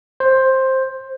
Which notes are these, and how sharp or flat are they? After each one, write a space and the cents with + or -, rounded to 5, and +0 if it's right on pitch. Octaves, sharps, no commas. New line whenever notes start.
C5 +10